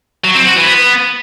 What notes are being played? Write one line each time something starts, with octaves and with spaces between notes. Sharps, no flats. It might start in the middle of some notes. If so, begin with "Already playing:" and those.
F#3
C4
F#4
E3
B3